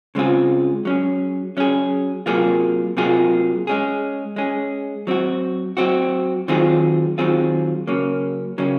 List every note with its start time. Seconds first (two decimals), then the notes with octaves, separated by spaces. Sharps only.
0.15 C#3 G#3 C4 F4 G#4
0.85 F#3 C#4 G#4
1.57 F#3 C#4 G#4
2.26 C3 F#3 A#3 F4 G#4
2.97 C3 F#3 A#3 F4 G#4
3.67 G#3 C#4 G#4
4.36 G#3 C#4 G#4
5.07 F#3 C4 F#4
5.77 F#3 C4 F#4
6.48 D#3 F#3 C4 F4 G#4
7.18 D#3 F#3 C4 F4 G#4
7.87 C#3 F#3 A#3 C#4
8.58 C#3 F#3 A#3 C#4